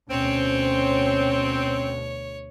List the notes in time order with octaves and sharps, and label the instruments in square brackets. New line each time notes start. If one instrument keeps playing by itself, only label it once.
[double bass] D2 B2 [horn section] C4 [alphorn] C#4 [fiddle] C#5